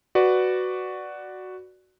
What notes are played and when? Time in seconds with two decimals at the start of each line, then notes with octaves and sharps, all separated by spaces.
0.15 F#4 B4 D5